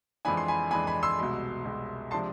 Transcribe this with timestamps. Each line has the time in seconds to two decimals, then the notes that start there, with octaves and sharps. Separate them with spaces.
0.25 F2 E3 G#3 D4 G#5 B5
0.37 C6
0.48 G#5 B5
0.71 F2 E3 G#3 D4 G#5 B5
0.87 G#5 B5
1.03 C6 E6
1.19 C2 B2 G#3
1.65 C2 B2 G#3
2.11 C3 F3 G#3 D4 A5 C6